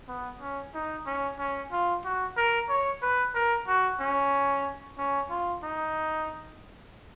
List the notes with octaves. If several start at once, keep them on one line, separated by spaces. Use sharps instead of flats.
B3
C#4
D#4
C#4
C#4
F4
F#4
A#4
C#5
B4
A#4
F#4
C#4
C#4
F4
D#4